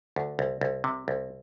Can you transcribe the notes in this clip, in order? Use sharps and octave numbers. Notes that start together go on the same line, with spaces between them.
D2
C2
C2
C3
C2